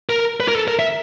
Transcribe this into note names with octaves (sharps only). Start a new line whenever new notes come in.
A#4
B4
A#4
A4
A#4
E5